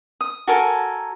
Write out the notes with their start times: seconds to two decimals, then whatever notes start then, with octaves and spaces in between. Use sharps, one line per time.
0.21 D#6
0.47 F#4 A4 A#4 G#5